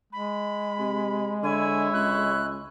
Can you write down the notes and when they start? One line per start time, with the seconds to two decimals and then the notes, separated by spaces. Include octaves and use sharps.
0.13 G#3 B5
0.79 C3
1.43 D3 E4 C#5 G#5
1.94 C#2 F#6